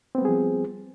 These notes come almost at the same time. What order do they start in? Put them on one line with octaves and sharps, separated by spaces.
C4 B3 G3 G#4 F3